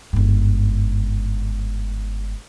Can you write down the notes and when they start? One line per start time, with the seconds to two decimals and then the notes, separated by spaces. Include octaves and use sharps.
0.13 G1 G#2